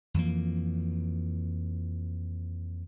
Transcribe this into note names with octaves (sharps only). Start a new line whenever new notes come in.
F2 E3 F3 A#3